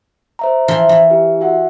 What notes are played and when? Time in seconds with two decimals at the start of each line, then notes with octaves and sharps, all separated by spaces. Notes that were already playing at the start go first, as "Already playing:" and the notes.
0.39 C5 E5 A#5
0.68 E3 F3 C6
0.89 E3
1.10 E4 G4
1.41 F#4 E5 F#5